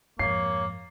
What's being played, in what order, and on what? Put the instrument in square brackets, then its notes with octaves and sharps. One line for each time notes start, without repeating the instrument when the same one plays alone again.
[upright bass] F2 G#2 [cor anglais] A#3 [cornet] C#5 [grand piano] C7